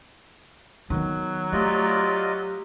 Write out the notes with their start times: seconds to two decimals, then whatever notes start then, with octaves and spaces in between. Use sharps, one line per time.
0.90 D#3 F#3 B3
1.52 A3 F4 G4 D5 D#5